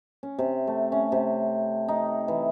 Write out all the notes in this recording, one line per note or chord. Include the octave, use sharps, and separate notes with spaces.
C#4
C3
A3
C#4
C3
D#4
E3